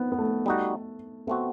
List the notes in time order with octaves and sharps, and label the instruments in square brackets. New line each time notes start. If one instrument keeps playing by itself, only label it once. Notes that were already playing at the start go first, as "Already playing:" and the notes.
Already playing: [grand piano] B3 C4 D#4
B3
A3
[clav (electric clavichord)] G3 D#4 F#4
[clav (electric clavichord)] A3 C4 F#4 [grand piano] B3